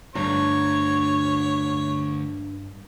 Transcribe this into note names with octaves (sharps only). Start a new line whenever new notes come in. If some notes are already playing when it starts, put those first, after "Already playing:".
D2 G2 D4 G4 C#5 A#5